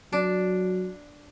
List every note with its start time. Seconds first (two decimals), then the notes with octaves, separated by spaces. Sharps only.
0.12 F#3 D4